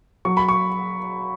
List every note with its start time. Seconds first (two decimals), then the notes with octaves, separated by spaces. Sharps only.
0.25 F#3 C#6
0.37 B5
0.49 C#6